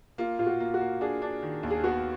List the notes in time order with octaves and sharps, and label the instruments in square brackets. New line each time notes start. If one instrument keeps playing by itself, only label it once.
[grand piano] A#3 [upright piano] F4
[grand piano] A#2 [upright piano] F4
[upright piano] F#4
[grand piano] A#3
[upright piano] F#4
[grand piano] A#3
[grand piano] D4 [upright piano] G#4
[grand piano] D4
D#3
D#2
[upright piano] G#4
[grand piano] B3 [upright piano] F#4